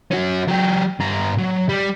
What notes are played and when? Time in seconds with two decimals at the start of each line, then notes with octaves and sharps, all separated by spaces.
0.11 C#4 F#4
0.48 F#3 G4
1.00 G2 A#5
1.38 F#3
1.69 G3